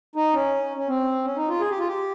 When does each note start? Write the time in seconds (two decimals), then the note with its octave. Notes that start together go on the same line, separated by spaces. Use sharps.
0.15 D#4
0.34 C#4
0.77 C#4
0.88 C4
1.25 C#4
1.36 D#4
1.49 F4
1.60 G#4
1.70 G4
1.79 F4
1.88 G4